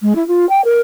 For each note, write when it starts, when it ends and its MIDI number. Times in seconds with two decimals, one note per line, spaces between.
0.02 0.13 56
0.15 0.26 64
0.27 0.45 65
0.49 0.61 79
0.64 0.80 70